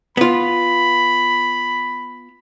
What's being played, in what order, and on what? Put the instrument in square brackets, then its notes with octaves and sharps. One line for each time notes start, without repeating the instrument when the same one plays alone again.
[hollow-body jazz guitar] B3 F4 [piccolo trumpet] B5